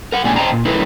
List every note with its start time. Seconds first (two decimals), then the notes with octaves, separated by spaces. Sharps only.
0.12 A#4 F#5
0.24 A#2 G#3 C4 D5 G#5
0.36 C5 D#5 F5 G5 A5 A#5
0.52 A#2
0.65 F#3 A3 D#4 E4 A#4 B4